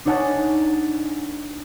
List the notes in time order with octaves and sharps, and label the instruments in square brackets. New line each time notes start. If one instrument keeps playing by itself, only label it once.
[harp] D4 D#4 C#5 F#5 G#5 A5